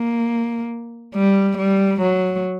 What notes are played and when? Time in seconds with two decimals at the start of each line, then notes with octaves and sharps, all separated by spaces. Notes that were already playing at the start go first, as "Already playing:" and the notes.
Already playing: A#3
1.15 G3
1.58 G3
2.02 F#3